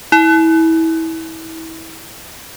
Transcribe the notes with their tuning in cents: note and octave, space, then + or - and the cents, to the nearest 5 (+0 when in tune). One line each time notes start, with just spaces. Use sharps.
E4 -25